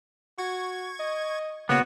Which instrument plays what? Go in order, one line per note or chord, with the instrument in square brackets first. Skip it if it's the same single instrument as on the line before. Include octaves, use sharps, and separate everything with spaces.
[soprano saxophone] F#4 [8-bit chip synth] C#6 G#6
[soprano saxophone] D#5
[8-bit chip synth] C#3 A#3 C#5 [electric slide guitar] B3 F#4